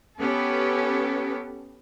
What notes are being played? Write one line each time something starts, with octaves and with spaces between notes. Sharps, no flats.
B3 C#4 G4 A4